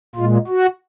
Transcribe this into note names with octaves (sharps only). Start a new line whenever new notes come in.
A#2 G#3 F4
F#4